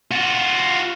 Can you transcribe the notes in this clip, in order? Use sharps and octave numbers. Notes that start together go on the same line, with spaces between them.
F4 F#4